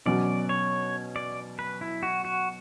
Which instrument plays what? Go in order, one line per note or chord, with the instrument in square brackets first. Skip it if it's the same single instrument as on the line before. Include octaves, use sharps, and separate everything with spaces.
[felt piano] B2 F#3 C#4 F#4 [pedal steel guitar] D5
[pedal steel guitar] C#5
D5
B4
E4
F#4
F#4